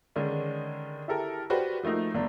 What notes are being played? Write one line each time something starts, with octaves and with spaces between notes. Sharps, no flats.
D3 D#3 G#3 C#4 D4
E4 G4 A4 A#4
F#4 G4 B4 C5 D5
F3 A3 A#3 D#4
G1 D4